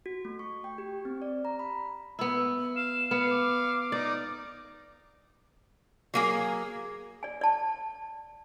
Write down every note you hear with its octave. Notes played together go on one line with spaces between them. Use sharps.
F#4
A3
C#6
G5
G4
C4
D5
A#5
B5
B3 E4
F5 E7
B3 F5 C#7
D6
D#4 D5
F#3 A#3 G#4
D5 G#5
D5 A5